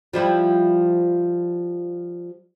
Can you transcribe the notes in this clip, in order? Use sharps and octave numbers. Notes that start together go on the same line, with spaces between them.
F3 G3 E4